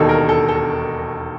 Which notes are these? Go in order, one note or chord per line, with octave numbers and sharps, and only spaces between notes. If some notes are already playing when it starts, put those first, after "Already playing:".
Already playing: E1 D#2 D#3 A4
A#4
A4
A4